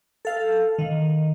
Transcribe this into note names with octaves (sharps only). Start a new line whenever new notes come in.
A4 F5
D#3